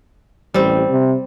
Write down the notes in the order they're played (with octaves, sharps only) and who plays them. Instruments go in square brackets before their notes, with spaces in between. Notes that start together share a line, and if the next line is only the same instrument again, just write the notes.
[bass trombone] A1 [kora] G3 C4
[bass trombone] C3